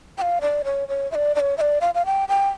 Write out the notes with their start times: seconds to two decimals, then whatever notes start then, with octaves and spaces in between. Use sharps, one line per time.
0.18 G5
0.22 F5
0.41 D5
0.64 C#5
0.88 C#5
1.11 E5
1.15 D5
1.35 D5
1.40 C#5
1.57 E5
1.61 D5
1.81 F5
1.94 F5
2.05 G5
2.28 G5